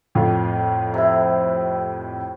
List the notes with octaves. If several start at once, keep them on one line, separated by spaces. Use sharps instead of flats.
F2 A2 F4
C3 E4